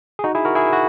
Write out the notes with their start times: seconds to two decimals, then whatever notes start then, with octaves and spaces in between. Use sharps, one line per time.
0.19 G#4
0.24 D#4 F#4
0.35 E4 G#4
0.45 F#4 A#4
0.55 E4 G#4
0.67 E4
0.73 F#4